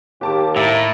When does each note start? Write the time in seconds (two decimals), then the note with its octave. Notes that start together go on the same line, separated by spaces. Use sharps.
0.21 D#2 G4 A5 D6
0.56 A2 E5 A#5